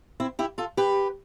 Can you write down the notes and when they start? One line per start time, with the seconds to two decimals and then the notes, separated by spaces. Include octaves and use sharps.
0.20 C4 E4
0.39 E4 G4
0.58 F4 A4
0.77 G4 B4